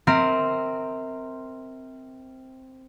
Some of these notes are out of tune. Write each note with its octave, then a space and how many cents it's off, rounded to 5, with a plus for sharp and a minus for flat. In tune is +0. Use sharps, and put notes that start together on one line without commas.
C4 +0 A#4 -15 E5 -30